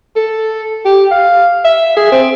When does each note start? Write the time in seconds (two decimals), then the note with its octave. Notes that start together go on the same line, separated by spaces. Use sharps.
0.16 A4
0.85 G4
1.11 F5
1.65 E5
1.97 G#4
2.12 C4